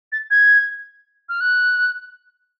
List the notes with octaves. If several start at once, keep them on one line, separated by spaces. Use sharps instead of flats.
A6
G#6
F6
F#6